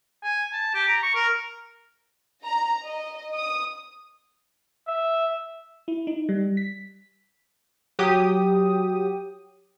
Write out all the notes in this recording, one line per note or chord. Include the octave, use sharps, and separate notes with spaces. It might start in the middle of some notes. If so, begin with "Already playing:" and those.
G#5
A5
G4
A#5
C#6
A#4
A#5
D#5
D#6
E5
E4
D#4
G3
B6
F#3 G4 D#6